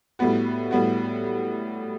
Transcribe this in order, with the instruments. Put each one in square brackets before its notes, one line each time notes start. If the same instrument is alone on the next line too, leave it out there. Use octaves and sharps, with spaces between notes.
[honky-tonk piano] A2 G3 B3 F#4
A2 G3 B3 F#4